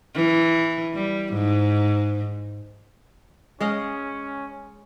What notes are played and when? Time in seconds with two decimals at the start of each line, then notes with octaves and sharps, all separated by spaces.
0.15 E3
0.94 G3
1.34 G#2
3.61 G#3 C#4 D#5 F5